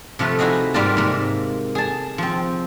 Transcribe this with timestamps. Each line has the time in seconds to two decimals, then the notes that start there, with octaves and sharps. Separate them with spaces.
0.19 C3 F3 A3 B4
0.39 D#4 E4 F#4 G#4 D#5
0.74 G#2 G3 A#3 F4 A#4 A5
0.97 G#2 C3 A#3
1.75 G#4 A5
2.18 F3 C4